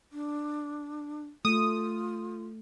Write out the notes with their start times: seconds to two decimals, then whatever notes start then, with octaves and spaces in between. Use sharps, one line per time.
0.12 D4
1.45 A3 F4 D#6